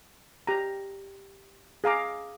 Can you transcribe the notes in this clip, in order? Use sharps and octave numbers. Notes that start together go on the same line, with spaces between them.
G4 A#5
G#4 F5 A#5 D6